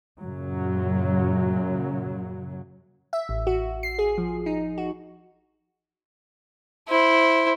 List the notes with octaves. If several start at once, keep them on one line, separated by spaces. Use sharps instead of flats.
F#2 A#2 C#3 F#3
E5
A1
F#4
C7
G#4
F3
D#4
F#4
E4 C5